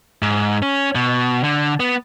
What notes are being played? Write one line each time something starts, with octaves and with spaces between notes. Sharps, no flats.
G#2
C#4
B2
D3
B3